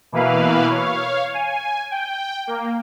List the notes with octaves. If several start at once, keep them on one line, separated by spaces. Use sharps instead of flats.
B2 E3 A#3 E4 B4 F5
C#5 F5
G#5
G5
A#3